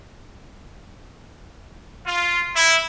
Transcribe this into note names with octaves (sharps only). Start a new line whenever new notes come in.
F4
E4